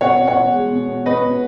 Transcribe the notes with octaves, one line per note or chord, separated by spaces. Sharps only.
B2 C#5 F#5
B2
C#5 F#5
B2
G#3
B2
B2
B2 B4 D#5
B2